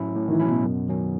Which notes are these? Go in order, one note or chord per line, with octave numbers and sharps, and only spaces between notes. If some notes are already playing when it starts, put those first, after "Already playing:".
Already playing: A2 F#3 C#4 E4
A2
D#3
E3
F#3 C#4 E4
B2
F#2
D#3 F#3 C#4